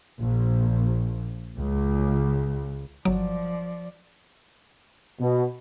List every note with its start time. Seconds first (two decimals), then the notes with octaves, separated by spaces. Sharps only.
0.19 A#1
1.57 C#2
3.05 G1 F3 F#3 D5
5.21 B2